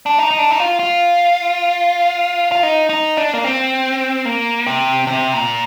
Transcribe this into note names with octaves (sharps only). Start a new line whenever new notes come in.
D4
D#4
D#4
D4
D#4
F4
F4
F4
D#4
D#4
D4
A#3
C4
A#3
C3
C3
A#2